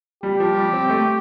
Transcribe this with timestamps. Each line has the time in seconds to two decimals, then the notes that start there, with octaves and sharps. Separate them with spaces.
0.23 G3 G4
0.40 F3
0.56 G3
0.73 C4
0.89 A3